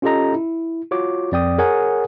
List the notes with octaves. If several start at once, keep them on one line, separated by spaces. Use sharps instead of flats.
C#4 F4 G4 A4 D#5 A#5
E4
F4 F#4 C#5 D6
F2 D5 G5 D#6
G#4 A#4 C#5 F#5 G#5 D#6